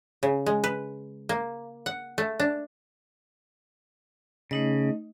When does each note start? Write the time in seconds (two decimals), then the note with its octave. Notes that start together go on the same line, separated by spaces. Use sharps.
0.23 C#3
0.46 G#3
0.64 B4
1.29 A#3
1.86 F#5
2.18 A3
2.40 D4
4.51 C#3 A3 D#4 D#5